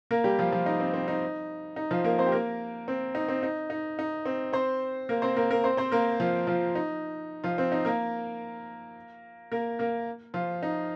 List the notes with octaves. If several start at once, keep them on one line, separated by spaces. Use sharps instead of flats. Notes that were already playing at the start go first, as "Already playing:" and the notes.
A#3 A#4
G3 G4
F3 F4
F3 F4
D#4
C4
C4
D#4
D#4
F3 F4
A#3 A#4
C4 C5
G4
A#3 A#4
C4
D#4
C4
D#4
D#4
D#4
C4
C4 C5
A#3 A#4
C4 C5
A#3 A#4
A#3 A#4
C4 C5
C4 C5
A#3 A#4
F3 F4
F3 F4
D#4
F3 F4
C4
D#4
A#3 A#4
A#3 A#4
A#3 A#4
F3 F4
D#4